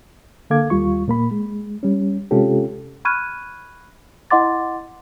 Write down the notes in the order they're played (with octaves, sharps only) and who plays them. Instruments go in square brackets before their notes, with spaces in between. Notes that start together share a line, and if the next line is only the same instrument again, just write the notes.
[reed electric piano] D3 A#3 A4 F5 D6 G#6
D#2 G3 F4 C#6
A#2 A#3 B5
G#3
G3 C#4
C3 G#3 C#4 F4 G4 A4
[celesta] B5 C#6 F6 F#6 G#6 D#7
E4 D#5 F#5 C6 D6 A6